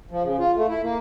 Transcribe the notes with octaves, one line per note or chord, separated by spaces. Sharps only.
F3
C#3
F4
A3
E4
A#3